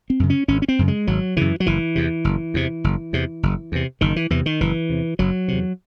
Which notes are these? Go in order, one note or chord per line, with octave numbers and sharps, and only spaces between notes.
C4
F#2 C#3
C#4
G#1 C#4
C#4
C4
F#2 C#3
G#3
G#1 F#3
F#2 C#3 E3
F#3
F#1 E3
E2 C3
F#1
E2 C3
F#1
E2 C3
F#1
E2 C3
F#1 D#3
E3
E2 C3 E3
D#3
F#1 E3
E2 C3
F#1 F#3
E2 C3